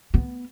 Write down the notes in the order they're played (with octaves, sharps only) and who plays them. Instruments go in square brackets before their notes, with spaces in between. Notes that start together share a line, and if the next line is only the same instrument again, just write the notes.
[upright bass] B3